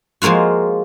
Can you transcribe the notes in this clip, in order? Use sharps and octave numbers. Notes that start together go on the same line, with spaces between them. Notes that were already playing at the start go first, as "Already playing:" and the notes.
F3 G#3 A#3 F4 F#4